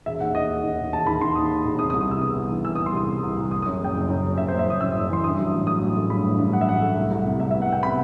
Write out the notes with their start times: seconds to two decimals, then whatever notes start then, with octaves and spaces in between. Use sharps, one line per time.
0.06 E1 E5
0.20 D#2 F#5
0.35 D#2 D#5
0.50 E1
0.63 D#3
0.79 E1
0.92 E1 A5
1.07 D#3 B5
1.21 D#3 C6
1.35 D#2 D#6
1.50 E1
1.65 E1
1.79 C3 D#6
1.90 D#6
1.93 C2
2.01 D#6
2.08 C3 E6
2.21 B3 D#6
2.36 C2
2.50 E3
2.65 E3 E6
2.75 C2 D#6
2.86 C6
2.94 C2 D#6
3.08 C3
3.22 C2
3.37 C2
3.51 F#1 D#6
3.62 D#6
3.66 F#2
3.81 F#1 G5
3.95 F#1
4.09 F#2
4.23 F#1
4.38 F#1 E5
4.48 C5
4.53 F#1
4.59 E5
4.67 F#2 D#6
4.81 F#2 E6
4.96 F#1
5.10 E3 C6
5.24 G2 D#6
5.38 F#3
5.53 A1
5.67 F#3 D#6
5.81 A1
5.97 A3
6.10 G2 B5
6.25 A1
6.39 G2
6.53 F#3 F#5
6.61 E5
6.68 A1 F#5
6.82 A3
6.97 C2
7.11 C2
7.26 C3
7.40 C2 E5
7.51 E5
7.54 B3
7.62 F#5
7.69 B3 G5
7.83 C3 B5